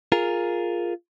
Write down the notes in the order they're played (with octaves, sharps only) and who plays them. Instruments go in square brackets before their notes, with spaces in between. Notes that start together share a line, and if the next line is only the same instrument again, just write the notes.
[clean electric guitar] F4 G#4 A#4